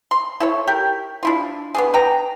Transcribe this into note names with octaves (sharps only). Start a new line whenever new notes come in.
C6
E4 A4 C#5
G4 A#4
D4 E4 F4
B3 D4 G#4
B4 G5 A#5